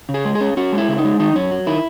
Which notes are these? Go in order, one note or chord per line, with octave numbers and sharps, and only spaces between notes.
C#3
G#4
G#3
G#4
C#4
C#4 F#4
G#3
E4
C#3
D#4
G#3
D#3 D#4
F#2 C#4
F#3
D#3 E4